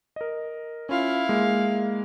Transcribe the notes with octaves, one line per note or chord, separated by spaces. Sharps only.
A#4 D#5
C#4 E4 F4 F5
G#3 A#3